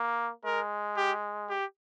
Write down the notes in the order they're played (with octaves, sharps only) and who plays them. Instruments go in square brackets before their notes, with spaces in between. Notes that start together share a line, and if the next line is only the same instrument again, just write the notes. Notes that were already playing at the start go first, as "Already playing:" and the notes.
Already playing: [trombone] A#3
[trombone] G#3 [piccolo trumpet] A#4
[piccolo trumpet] G4
G4